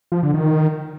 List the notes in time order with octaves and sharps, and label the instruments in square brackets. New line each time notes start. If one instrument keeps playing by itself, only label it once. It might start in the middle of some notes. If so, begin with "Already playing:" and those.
[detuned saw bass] F3
D3
D#3